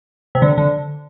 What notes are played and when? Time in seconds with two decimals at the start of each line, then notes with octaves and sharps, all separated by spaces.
0.35 C3
0.42 D3
0.58 D3